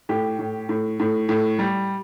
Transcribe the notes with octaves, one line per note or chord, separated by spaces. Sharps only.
A2 G4
A2
A2
A2
A2
G3